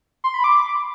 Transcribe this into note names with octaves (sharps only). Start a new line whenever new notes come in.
C6
B5
D6